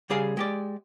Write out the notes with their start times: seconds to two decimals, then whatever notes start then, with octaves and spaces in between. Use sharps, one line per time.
0.10 C#3 G3 G#4 F5
0.37 G#3 G4 D5